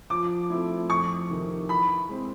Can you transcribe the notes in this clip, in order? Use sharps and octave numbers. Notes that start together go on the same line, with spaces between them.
F3 D6
A3 C4 E4
F2 C#6
C3 D#3
E3 B5
G#3 C4